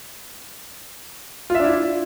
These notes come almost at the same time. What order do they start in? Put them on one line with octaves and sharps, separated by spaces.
F4 E5 D4 E4